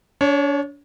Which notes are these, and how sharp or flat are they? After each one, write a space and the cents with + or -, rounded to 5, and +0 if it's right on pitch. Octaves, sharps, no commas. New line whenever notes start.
D4 -40 C#5 +0